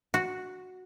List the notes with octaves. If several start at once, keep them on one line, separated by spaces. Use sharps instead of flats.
F#4